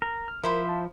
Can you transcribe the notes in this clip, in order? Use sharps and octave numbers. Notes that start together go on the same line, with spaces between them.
A#4
F6
F3 E4 A#4 C5 B5
F5 A5